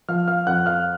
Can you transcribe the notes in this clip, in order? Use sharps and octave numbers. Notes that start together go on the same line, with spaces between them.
F3 F5 F6
F5 F6
F2 F#5 F#6
F5 F6